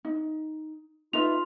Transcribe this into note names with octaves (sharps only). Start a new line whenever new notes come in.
D#4
D#4 F4 B4 E5 F7